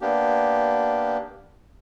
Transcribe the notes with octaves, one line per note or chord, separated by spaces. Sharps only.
A#3 B3 D4 G4